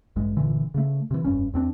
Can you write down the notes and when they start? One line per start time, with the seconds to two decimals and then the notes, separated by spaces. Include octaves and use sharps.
0.16 A1 G2 G#3
0.37 G1 A#2 D3 E3
0.74 C#3 A3
1.11 C3 E3
1.24 F1 G2 C#4
1.54 E2 C4 D4